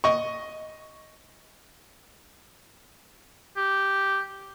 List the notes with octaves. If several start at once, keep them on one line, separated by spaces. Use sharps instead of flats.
D#5 C#6
G4